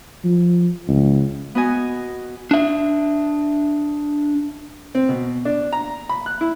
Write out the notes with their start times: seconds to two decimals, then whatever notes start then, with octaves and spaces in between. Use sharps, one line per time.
0.25 F3
0.88 C#2
1.55 B3 F#4 D#5 G#5
2.51 D4 E5
4.95 C4
5.09 B2
5.45 D4
5.72 A#5
6.09 B5
6.26 F#6
6.41 E4